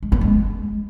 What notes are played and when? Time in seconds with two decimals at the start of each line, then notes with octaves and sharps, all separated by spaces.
0.03 G#3
0.12 B3
0.21 G#3